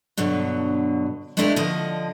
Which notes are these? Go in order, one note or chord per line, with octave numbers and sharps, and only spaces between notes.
G2 B2 D3 F#3
G#3 A3 B3 D4 E4 G4
D3 F3 D#5